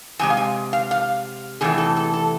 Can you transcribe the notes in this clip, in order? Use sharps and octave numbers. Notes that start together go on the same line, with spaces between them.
F2 C3 G#3 G#5
F5
G#5
F5
F5
E2 C3 E3 A3 G#4
A4
A4
A4